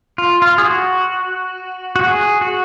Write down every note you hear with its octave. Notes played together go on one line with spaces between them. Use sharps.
F4
F4
G#4
F#4
F#4
G#4
F#4